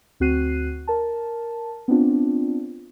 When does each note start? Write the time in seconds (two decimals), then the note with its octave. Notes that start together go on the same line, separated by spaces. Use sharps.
0.20 D2 C4 F#4 F#6 C7 D#7
0.88 A#4 A5
1.88 B3 C4 D4 F4